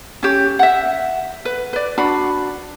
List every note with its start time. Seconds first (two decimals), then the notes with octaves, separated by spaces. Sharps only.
0.23 C#4 G4
0.59 E5 F#5
1.45 B4
1.73 B4 D5
1.98 D4 F#4 B5